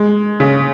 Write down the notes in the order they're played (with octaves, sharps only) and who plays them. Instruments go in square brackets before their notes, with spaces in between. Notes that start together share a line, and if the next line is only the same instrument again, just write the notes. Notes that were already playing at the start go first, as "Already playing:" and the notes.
Already playing: [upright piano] G#3
C#3